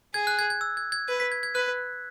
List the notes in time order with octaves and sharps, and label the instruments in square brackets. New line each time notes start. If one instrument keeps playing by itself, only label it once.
[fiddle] G#4 [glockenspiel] G#6
[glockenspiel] F#6
G#6
G#6
E6
G#6
G#6
[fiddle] B4 [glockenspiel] G#6
[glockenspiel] B6
G#6
G#6
[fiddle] B4 [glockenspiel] F#6